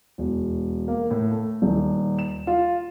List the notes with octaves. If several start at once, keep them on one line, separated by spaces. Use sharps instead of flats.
E1
A#3
A2
A3
D#1
E7
F4